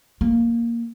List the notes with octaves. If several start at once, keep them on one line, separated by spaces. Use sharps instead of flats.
A#3